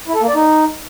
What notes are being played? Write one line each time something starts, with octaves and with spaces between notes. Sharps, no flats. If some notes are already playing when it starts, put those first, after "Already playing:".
E4
A4
A#3
D5
D#4